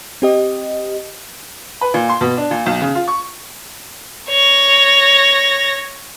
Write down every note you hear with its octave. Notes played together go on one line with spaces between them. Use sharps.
C4 G4 D#5
B4
A#2
C6
B2
D4
A#2
B1
C#3
F4
C#6
C#5 A#6